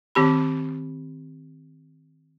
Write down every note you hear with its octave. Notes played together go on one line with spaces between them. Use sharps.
D#3 C4 G4 B5